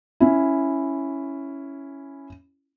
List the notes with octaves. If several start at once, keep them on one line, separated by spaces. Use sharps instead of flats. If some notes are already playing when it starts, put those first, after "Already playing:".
C#4 E4